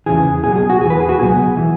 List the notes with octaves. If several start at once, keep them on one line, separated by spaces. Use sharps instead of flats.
E2 C#3 E3 G#4
B1 B2 F#3 G#4
G#4
F#4
E2 E3 G#4
B4
G#4
F#4
C#2 B2 F#3 G#4
E3